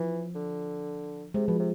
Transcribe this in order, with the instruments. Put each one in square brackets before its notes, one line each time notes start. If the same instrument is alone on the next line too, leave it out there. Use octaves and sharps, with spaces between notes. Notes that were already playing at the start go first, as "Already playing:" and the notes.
Already playing: [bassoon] E3 [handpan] F3
[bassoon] D3
[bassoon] C3 [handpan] G#3
[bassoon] B2 [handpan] F3
[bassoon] C3